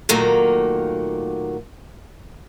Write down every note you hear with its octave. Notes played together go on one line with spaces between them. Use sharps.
A#2 D#3 F#3 A3 A#3